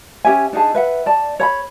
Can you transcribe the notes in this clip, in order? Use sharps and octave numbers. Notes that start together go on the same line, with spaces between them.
C#4 G4 E5 G#5
D4 D#4 G#4 A5
B4 E5 F#5
D5 A5
C#5 A#5 B5